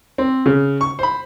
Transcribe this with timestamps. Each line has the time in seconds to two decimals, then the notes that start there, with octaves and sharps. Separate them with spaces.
0.18 C4
0.46 C#3
0.81 C#6
0.99 C5 B5